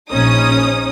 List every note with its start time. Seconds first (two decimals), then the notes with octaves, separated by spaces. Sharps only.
0.10 A#1 C#4 D#4 D#6